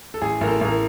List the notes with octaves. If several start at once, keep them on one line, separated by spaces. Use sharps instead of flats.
A4
A1 G#4
A1 A#4
A4
A1 A#4